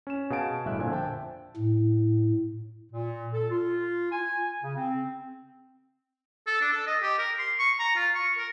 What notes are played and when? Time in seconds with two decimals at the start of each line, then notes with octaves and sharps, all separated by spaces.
0.07 C#4 E7
0.30 B2 G#4 F5 G#5 A5 D7
0.65 G1 A2 E5 F#6
0.79 F2 A#2 D3 C5 G#5
0.92 C5 E5 G5 A5
1.57 A2
2.92 A#2
3.33 A4
3.51 F4
4.12 G#5
4.62 C#3
4.77 C4
6.47 A4
6.61 D4
6.72 A4
6.87 D#5
7.02 G4
7.18 A#4
7.39 C6
7.59 C#6
7.79 A#5
7.96 F4
8.15 C#6
8.38 A#4